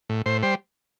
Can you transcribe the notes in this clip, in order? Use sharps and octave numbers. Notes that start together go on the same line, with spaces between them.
A2
A2 C5
G3 C5